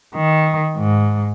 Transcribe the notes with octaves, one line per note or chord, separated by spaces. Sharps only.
D#3
G#2